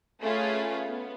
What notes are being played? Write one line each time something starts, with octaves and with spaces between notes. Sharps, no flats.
A3 C#4 F4 G#4 B4
B3